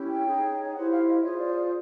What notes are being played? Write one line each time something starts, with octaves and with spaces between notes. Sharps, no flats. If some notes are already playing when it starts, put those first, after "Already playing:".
Already playing: C#4 E4 G4
G5
D#4 G#4 C#5
G5
E4 G4 C5 F#5
F5
D#5
F4 G#4 C5 C#5
D5
D5